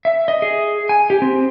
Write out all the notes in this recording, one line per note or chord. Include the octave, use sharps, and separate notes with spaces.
E5
D#5
G#4
G#5
G4
C4